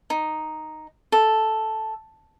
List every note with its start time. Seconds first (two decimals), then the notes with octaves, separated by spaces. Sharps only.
0.10 D#4
1.12 A4